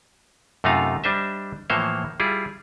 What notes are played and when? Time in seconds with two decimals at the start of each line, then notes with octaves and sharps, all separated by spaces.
0.64 F#2 C3 A3 D#4 F4 F5
1.04 G3 D4 C5 D#5 E5
1.70 A2 E3 F3 A#3 C5 C#5
2.20 G3 E4 F4 G#4